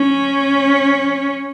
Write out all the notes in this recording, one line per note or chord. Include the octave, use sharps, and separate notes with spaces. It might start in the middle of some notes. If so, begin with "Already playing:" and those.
Already playing: C#4